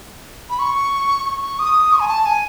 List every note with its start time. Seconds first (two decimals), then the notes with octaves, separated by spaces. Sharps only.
0.50 B5
0.59 C#6
1.26 C#6
1.42 C#6
1.59 D#6
1.92 C#6
2.00 G#5
2.08 A5
2.26 G#5